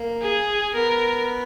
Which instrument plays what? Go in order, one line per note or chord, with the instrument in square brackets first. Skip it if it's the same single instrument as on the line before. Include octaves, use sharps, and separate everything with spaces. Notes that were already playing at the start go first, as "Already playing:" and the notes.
Already playing: [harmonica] A#3
[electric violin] G#4
[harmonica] B3 [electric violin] A#4